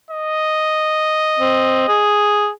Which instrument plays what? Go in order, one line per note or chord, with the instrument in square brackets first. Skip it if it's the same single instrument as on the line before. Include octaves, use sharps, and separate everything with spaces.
[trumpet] D#5
[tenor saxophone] C4
G#4